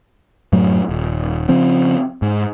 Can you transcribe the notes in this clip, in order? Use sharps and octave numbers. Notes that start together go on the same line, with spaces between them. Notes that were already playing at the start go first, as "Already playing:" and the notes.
F#2 A2 F#3
D#1
C#3 F3 C4
G#2